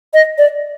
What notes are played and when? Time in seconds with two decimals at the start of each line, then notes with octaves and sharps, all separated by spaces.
0.14 D#5
0.38 D5